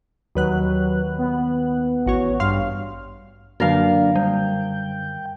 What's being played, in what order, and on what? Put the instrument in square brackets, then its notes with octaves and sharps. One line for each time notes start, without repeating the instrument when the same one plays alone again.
[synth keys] D#2 B4 F#6 [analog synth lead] F#3
[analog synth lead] B3
[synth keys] A1 F#4 C#5
[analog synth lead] G2 [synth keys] F5 C6 F6
[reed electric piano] F#2 D3 [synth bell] F#3 F#4 [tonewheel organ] A#3 D4 [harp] A#4 F5
[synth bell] G3 [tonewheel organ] G5